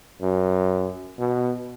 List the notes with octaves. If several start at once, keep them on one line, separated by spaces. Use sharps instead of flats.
F#2
B2